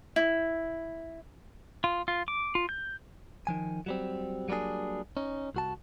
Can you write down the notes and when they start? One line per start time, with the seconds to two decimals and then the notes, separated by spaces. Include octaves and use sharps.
0.16 E4
1.84 F4
2.08 F4
2.28 D6
2.55 F4
2.69 G6
3.47 D#3 F3 G#5
3.86 F#3 G3 C4
4.49 F#3 G3 A#3 D4 G#4
5.17 C#4 D#4
5.55 C2 F#4 A5